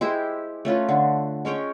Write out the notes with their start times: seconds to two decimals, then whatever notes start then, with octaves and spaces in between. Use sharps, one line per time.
0.01 G#3 E4 G4 C5
0.65 A3 C#4 F4 B4
0.89 D3
1.45 G#3 C#4 C#5 G5